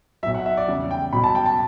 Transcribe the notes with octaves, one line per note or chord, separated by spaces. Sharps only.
B1 B2 F#3 E5
F#5
E5
D5
E2 C#3 G3
G5
B1 B2 G3 B5
A5
G5
A5